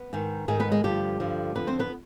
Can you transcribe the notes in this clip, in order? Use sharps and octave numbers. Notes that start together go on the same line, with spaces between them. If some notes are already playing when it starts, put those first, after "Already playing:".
Already playing: B3
G#2 D#3
G#2 D#3 G#3 G#4
B3 B4
G#3 G#4
G2 D3 F3 G3 G4
G2 D3 F3
F2 D3 F3 B3 B4
C4 C5
B3 B4